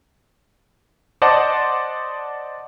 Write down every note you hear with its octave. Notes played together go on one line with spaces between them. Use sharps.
C5 D5 D#5 F#5 A5